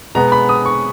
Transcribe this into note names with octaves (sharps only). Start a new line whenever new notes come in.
B2 G#3 B3 A#5
B5
D#6
C#6